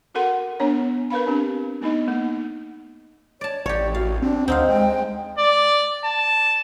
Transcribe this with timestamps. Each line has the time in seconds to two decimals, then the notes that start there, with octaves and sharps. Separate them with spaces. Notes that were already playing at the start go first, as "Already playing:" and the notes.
0.14 F#4 A4 A#4 F#5 C6
0.60 B3 D4 C#5
1.10 A#4 B4 F5 B5
1.26 C4 D4 G4
1.81 A3 B3 D#4 D#5
2.08 A3 A#3
3.41 C#5 D5 A5
3.66 A1 G4 C#5 D5
3.95 F#4 F5
4.22 C4 D4
4.48 D2 C4 D#4 F5 F#5
4.69 G#3 G5
5.39 D5
6.05 A5